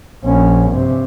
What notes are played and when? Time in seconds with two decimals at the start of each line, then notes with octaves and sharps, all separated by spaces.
0.24 A#1 C#4
0.71 G2 C3